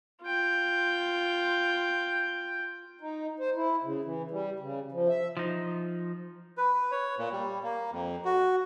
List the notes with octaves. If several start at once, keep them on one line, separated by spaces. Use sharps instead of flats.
F4 G5
D#4
C5
E4
C#3
E3
G3
C#3
F3
E5
F3 D#4
B4
C#5
A#2
G3
A#3
F2
F#4